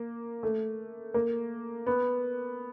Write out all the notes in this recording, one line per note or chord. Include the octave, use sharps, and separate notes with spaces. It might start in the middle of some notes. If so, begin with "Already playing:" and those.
Already playing: A#3
A3
A#3
B3